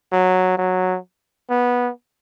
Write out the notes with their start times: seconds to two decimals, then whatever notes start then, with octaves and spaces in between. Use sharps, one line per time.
0.12 F#3
0.57 F#3
1.50 B3